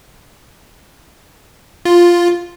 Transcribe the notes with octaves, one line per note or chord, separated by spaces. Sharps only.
F4